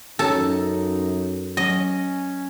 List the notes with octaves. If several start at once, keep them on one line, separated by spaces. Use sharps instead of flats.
F#2 C#4 D#4 A4 C#5 A5
F#3 C#4 D#5